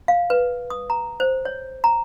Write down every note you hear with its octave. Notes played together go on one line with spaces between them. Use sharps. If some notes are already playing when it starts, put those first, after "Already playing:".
F5
B4
D#6
A#5
C5
C#5
A#5